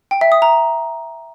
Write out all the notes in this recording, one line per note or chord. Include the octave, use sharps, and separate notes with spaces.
G5
E5
D#6
A#5